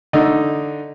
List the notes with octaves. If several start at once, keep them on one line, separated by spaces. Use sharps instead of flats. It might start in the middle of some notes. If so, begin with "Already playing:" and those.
D3 A3 D#4